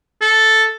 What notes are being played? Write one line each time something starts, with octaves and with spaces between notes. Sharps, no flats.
A4